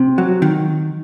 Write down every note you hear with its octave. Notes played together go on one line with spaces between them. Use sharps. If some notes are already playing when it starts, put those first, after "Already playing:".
Already playing: C3
F#3
D#3